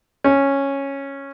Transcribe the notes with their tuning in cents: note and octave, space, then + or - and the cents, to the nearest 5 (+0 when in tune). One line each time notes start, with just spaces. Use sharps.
C#4 -5